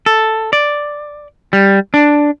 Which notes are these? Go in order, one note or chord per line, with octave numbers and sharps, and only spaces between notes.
A4
D5
G3
D4